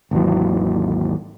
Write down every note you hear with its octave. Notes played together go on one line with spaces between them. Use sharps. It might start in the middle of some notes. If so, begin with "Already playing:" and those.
G#1 D#2 E3 F#3